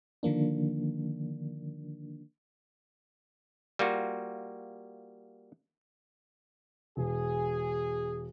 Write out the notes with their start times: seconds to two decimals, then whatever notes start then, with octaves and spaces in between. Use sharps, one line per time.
0.23 D3 D#3 F3 A#3 D4
3.79 G3 A#3 F4 F#4
6.97 E1 G#4